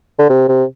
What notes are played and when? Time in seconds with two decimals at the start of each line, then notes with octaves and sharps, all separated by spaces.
0.19 D3
0.29 C3
0.48 C3